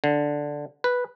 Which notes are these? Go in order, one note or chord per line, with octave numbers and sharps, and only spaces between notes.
D3
B4